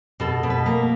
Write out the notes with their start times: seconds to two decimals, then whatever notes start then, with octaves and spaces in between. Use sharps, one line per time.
0.20 B2 A4
0.43 B2
0.50 B4
0.66 A#3